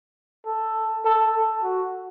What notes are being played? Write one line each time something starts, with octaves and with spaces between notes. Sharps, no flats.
A4
A4
A4
F#4